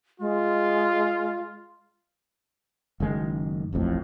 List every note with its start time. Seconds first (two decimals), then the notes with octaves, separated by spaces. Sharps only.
0.20 G#3 F4
3.00 F#1 D#3 G#3
3.73 D#1 A1 F2 A2